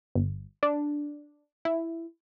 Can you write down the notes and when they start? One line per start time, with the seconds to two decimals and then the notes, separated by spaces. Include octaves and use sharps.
0.15 G1
0.63 D4
1.65 E4